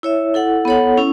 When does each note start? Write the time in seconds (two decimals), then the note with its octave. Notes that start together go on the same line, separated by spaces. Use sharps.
0.03 E4 C#5 E5
0.34 E4 A4 F#5
0.65 B3 A4 C#5 F#5
0.97 C#4 E4